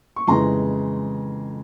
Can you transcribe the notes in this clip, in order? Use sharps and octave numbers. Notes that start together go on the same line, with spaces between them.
C#6
F2 C#3 E3 G#3 A#5 C6